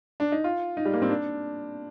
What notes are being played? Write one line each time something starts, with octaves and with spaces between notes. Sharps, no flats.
D4
D#4
F4
D#4
G3
A#3
C4
D4